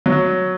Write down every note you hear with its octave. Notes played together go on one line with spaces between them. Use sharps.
F#3